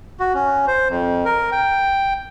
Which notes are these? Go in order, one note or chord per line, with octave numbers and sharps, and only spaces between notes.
F#4
C#4
C5
F2
A#4
G5